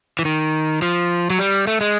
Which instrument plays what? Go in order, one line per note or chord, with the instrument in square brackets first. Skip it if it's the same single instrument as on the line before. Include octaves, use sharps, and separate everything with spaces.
[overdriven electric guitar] E3
D#3
F3
F#3
G3
A3
G#3